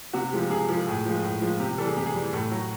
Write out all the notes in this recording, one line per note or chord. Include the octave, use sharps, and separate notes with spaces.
C3 F#4
F3 G#3 G4
C3 G#4
F3 G#3 A4
A2 G#4
F3 G#3
A2
F3 G#3
C3 G4
E3 G3 A4
G#4
C3 G4
G#4
E3 G3
A2 A4
F#3